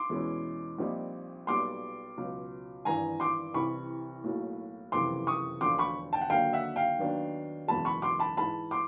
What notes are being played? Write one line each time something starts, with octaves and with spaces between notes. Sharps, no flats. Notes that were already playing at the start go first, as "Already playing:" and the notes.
Already playing: C6 D6
E2 B2 G#3 C#4 E4
A#1 A#2 G3 C4 D#4
B1 A#2 G3 B3 C6 D6
C#2 B2 F#3
G#1 G2 E3 G#5 A#5
C6 D6
C2 C3 E3 B5 C#6
B1 A2 F#3 A#3
F#1 F2 C3 E3 C6 D6
C#6 D#6
E1 D2 D3 F3 C6 D6
B5 C#6
G5 A5
F#5
D#2 D3 F#3 A#3 F5 G5
E5 F#5
F5 G5
D#2 D#3 F#3 B3 D4
F#1 E2 B2 G#3 A5 B5
B5 C#6
C6 D6
A5 B5
G#2 E3 G#3 A5 B5
C6 D6